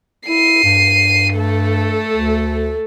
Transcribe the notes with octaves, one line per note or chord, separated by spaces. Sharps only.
E4 C7 D#7
G2
A3 A4
D2